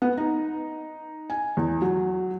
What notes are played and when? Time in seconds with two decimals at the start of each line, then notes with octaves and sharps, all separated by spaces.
0.02 B3
0.18 D#4
1.30 G#5
1.57 E2
1.82 F#3